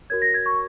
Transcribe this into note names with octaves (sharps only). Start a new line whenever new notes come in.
F#4 A#4 C#5 G#6
A#6
G#6
C#6